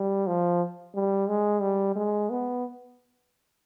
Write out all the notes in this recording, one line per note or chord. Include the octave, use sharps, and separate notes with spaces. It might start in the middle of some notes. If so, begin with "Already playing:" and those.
Already playing: G3
F3
G3
G#3
G3
G#3
B3